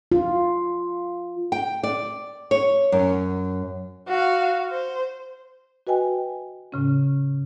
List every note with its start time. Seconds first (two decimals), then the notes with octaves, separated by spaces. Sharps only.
0.12 F4
1.52 G5
1.83 D5
2.51 C#5
2.92 F#2
4.08 F#4 F5
4.71 C5
5.87 F#4 B4 D#5 G5 G#5
6.72 A2 C#3 C#4